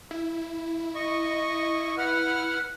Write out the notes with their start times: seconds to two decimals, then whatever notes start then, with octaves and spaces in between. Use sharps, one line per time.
0.11 E4
0.95 D#5 C#6
1.98 B4 F#5 F6